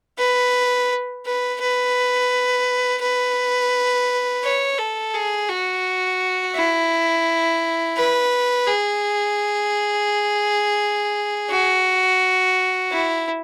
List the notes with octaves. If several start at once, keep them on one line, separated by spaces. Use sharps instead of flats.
B4
B4
B4
B4
C#5
A4
G#4
F#4
E4
B4
G#4
F#4
E4